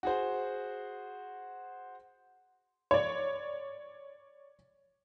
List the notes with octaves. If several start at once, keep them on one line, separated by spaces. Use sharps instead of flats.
F#4 G#4 C5
C#5 D5